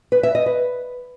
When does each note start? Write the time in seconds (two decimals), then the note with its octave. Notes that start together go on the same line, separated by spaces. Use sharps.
0.12 B4
0.23 E5
0.35 D#5
0.46 B4